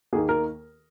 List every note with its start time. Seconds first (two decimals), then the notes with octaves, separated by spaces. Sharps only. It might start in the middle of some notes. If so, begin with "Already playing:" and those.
0.13 D#2 D#3 A#3 G#4
0.29 A#4